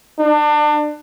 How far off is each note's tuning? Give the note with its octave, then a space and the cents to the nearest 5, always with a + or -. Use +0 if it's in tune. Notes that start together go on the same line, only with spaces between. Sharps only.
D4 +30